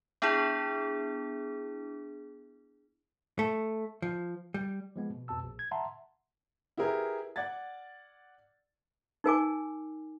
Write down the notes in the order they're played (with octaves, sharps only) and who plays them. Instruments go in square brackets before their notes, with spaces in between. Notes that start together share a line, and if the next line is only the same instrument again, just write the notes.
[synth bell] B3 D4 E4 G#4
[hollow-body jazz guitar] A3
F3
G3
[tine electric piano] F3 G#3 B3
B2
F2 B2 A5 E6
A#1
G#6
E5 F#5 A5 A#5 C6
[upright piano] E4 G4 G#4 A#4 B4
D5 F#5 G#6 A6
[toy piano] D#4 A#4 G#5 D6